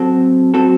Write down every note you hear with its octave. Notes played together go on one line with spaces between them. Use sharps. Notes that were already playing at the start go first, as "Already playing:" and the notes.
Already playing: F#3 C4 F#4 A4
F#3 C4 F#4 A4